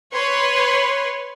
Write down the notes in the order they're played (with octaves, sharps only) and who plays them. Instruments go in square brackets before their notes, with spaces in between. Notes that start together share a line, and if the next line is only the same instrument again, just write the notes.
[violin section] B4 C#5 C6